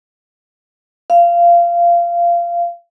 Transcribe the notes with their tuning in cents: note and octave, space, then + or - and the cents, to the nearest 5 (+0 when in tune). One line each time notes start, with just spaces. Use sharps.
F5 -20